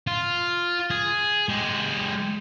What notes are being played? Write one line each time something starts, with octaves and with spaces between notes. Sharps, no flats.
F4
G#4
G#3 G4